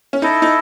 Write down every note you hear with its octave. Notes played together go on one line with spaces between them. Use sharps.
C#4
D#4 E4 A4 D#5
D#4